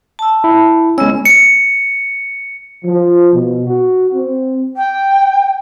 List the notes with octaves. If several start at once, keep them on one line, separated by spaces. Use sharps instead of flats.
A5 E6
E4
G#3 B3 C#4 E6
C#7
F3
B2
F#4
C4
G5